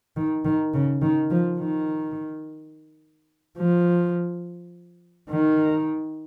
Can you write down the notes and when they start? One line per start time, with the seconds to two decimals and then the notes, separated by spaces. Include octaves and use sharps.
0.16 D#3
0.45 D#3
0.74 C#3
1.02 D#3
1.30 F3
1.59 D#3
3.58 F3
5.30 D#3